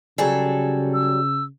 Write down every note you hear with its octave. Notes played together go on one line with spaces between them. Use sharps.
C#3 F#3 G3 G#4 A4
E6